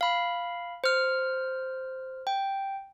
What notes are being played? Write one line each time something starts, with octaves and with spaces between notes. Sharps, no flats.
F5 B5
C5 F6
G5